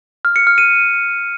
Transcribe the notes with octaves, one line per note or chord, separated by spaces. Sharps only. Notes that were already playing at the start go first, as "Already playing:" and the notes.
F6
C#7
F6
D#7